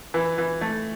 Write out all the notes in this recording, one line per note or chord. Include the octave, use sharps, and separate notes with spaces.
E3
E3
A3